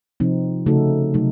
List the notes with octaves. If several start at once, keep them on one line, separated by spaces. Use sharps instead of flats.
C3 F3 C4 D#4
C#3 A3 D#4 F#4 A4
C3 F#3 A3 D#4